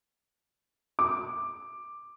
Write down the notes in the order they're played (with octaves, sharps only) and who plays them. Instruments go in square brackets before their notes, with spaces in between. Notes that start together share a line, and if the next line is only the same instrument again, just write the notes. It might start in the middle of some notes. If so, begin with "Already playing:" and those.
[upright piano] D6